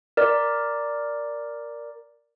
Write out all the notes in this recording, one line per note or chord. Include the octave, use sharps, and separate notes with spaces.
A#4 D5